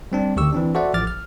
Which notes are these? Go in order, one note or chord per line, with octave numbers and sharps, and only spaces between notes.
G3 C4 D4
D2 D3 D#3 G4 C#6 E6
E3 C4 D4
F#4 A4 C5 D5 E5 F#5
A1 F3 D6 F6 A6
F6